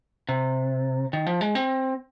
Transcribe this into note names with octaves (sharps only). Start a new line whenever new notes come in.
C3
D#3
F3
G#3
C4